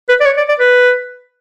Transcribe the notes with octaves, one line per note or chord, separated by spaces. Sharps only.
B4
D5
C#5
D5
D5
B4